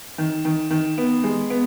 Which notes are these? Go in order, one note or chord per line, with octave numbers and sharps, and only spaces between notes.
D#3
D#3
D#3
B3
G#3
B3